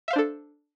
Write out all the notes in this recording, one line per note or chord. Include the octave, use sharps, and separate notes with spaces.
D4 A4 C5 E5 F5